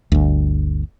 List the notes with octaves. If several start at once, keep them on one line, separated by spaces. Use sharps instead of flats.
G1 D2